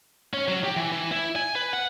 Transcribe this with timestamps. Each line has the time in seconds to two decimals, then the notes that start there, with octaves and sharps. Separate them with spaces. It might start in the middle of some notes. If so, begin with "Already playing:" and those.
0.33 C#4
0.48 F#3
0.64 G4
0.76 E3
0.92 E3
1.11 E4
1.36 G#5
1.56 B4
1.73 F#5